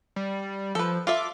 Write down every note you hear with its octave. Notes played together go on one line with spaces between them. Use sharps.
G3
F3 A4 B4
F4 A4 E5 D6